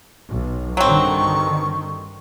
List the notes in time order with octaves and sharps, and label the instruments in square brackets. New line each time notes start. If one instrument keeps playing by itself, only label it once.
[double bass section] B1
[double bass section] G2 D3 D#3 [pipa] F#3 C4 [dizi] C#6